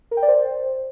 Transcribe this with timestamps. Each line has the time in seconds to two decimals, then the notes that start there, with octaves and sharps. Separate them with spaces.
0.11 A#4
0.17 G5
0.23 D5
0.28 C5